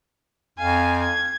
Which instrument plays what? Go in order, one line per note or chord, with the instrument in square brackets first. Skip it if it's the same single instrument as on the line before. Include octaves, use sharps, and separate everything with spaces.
[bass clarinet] F2 [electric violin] F5 G#5
[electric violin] G#6